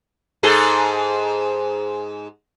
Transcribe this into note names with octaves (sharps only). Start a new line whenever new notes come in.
G#2 G#4 A4